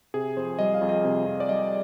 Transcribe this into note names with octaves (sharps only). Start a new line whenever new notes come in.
C3 G#4
F2 C5
G3 D#5
F5
F2
D#5
C3
F2
D5
G3 D#5